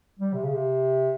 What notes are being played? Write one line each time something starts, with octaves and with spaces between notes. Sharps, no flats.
G3
C3
C#3
C3